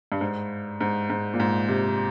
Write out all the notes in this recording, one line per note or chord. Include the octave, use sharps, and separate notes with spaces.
G2
G#2
G#2
G#2
A#2
G#2
C3